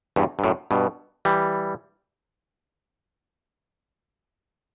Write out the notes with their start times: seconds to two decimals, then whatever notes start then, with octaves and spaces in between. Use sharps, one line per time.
0.16 E2 G2
0.39 G2
0.44 F#2 A2
0.71 G2 B2
1.25 E3 G3